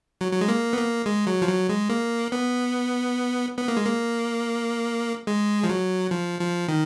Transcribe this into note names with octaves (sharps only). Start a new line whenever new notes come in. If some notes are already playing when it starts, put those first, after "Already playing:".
F#3
F#3
G#3
A#3
B3
A#3
G#3
F#3
F3
F#3
G#3
A#3
B3
B3
A#3
G#3
A#3
G#3
F3
F#3
F3
F3
D#3